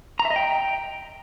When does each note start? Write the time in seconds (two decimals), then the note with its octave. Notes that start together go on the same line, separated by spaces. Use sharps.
0.19 A#5
0.25 E5
0.30 D#5
0.36 G5